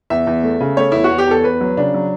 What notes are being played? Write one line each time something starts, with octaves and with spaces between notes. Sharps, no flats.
E2 E5
E2
A3
C#3
A3 C#5
E2 E4
F#4
E2
G4
E2 A4
E2 B4
F#3
C#3 D4
F#3